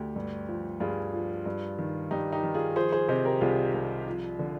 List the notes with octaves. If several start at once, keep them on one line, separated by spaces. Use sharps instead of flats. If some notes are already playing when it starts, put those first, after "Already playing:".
Already playing: D2 G4
G2
F3
G2 F4 G#4
F3
G2
D#3
G2 D#4 G4
D#4 G4
D#3
F4 G#4
F3 G#4 C5
G#4 C5
C3 C5 D#5
G4 A#4
C2 F4 G#4
C2
F3
D3